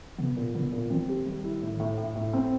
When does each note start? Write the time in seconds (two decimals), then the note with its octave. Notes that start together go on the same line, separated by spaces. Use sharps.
0.18 C3 B3
0.36 A#2
0.54 C#3 B3
0.72 A#2
0.90 D#3 C4
1.09 G4
1.26 G3
1.44 E4
1.61 A2
1.80 A2
1.98 A2
2.15 A2
2.33 C4